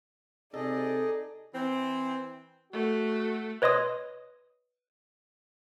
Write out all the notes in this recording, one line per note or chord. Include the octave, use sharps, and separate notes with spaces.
C3 D#4 G#4 A4 D5 D#5
E3 C4
A3 F#4
B4 C#5 D#5 C6 D#6